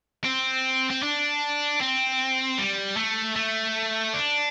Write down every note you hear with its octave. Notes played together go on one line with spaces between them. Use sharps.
C4
C4
D4
C4
G3
A3
A3
D4